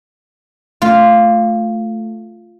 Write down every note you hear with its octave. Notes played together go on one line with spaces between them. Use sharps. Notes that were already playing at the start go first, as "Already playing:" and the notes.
A3 F4